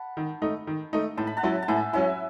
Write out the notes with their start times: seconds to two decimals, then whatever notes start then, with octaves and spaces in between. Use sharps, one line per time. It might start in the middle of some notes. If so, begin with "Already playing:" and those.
Already playing: F#5 A5 B5
0.17 D#3
0.42 A3 D#4
0.67 D#3
0.93 A3 D#4
1.17 A2 A5
1.27 B5
1.37 F#5 A5
1.43 F#3 C#4 E4
1.62 A5
1.68 A2 E5 G#5
1.93 F#3 C#4 E4 E5 G#5